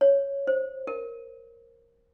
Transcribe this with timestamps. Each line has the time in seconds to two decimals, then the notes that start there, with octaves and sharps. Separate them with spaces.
0.01 C#5
0.47 C5
0.87 A#4